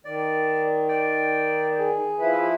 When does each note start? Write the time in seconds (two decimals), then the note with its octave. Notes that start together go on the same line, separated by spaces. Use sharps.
0.05 D#3 D5
0.89 D5 G5
1.78 G#4
2.19 F3 E4 B4